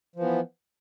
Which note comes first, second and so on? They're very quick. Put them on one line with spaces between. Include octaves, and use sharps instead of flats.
F3 E3 B3